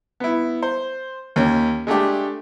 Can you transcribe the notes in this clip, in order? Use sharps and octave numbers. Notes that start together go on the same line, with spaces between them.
B3 E4
C5
D#2 C#4
G#3 A3 D4 G4